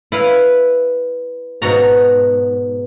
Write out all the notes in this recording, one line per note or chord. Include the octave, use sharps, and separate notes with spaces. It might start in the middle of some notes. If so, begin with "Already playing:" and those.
E4 B4 F5
G#2 B2 F#4 A#5